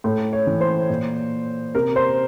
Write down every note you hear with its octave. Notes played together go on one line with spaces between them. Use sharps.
A2
C#5
E3
C5
A#2
C3 A#4
C5